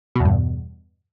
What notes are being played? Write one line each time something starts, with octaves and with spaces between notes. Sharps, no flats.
E2 G2 B2